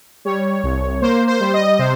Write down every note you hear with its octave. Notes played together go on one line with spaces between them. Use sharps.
G3 C#5
C2
A#3 C5
C5
G3
D#5
C3 C5